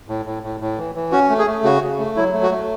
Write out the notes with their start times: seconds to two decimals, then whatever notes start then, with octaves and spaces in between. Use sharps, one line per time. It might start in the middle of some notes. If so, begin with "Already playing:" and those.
0.09 A2
0.26 A2
0.43 A2
0.60 A2
0.78 E3
0.95 E3
1.12 C#4 F#4
1.30 A3
1.39 G#4
1.47 A3
1.64 C#3 F#4
1.82 C#3
1.99 A3
2.16 F#3 E4
2.34 A3
2.43 F#4
2.51 A3